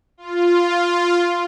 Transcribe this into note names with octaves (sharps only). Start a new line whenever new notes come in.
F4